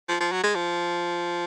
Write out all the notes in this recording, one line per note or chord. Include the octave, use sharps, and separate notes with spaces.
F3
F3
F#3
G#3
F3